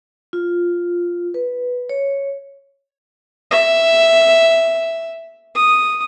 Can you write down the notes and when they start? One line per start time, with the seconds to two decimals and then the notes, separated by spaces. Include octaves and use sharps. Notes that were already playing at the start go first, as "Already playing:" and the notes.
0.33 F4
1.34 B4
1.89 C#5
3.51 E5
5.56 D#6